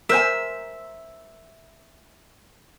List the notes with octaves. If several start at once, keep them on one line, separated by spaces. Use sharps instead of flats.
A#4 C5 E5 G#5